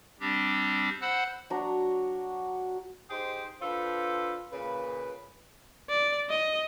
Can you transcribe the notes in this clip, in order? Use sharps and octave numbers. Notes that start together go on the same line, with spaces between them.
G3 C4 D4 G4
C5 F#5 B5 E6 F#6
F#3 D4 F#4 A#5
D#4 G4 G#4 C5
D4 F4 A4 B4 C5
A#2 C#3 B4
D5
D#5